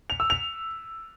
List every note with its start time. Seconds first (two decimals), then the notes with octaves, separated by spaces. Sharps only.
0.10 F7
0.20 E6
0.30 F7